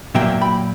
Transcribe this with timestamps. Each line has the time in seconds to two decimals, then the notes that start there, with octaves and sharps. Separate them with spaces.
0.15 A#2 F#3 A#3 E5 G5
0.41 G5 B5